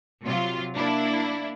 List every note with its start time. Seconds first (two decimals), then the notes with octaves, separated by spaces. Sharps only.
0.23 C3 F#3 F4
0.75 A#3 D4 E4